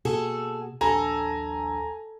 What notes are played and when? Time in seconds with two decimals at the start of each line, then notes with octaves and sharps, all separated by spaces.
0.05 B2 A#3 F#4 G#4 A4
0.81 D#1 A#1 D4 A4 G#5 A#5